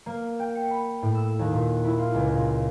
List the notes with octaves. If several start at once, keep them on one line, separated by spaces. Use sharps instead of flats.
A#3
G5
C#7
B5
A2
E6
D#2
A#2
E4
F4
C#2
A#2